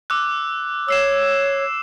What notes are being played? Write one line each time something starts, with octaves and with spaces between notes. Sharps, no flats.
D6 E6 F#6
C#5 E6 C7 E7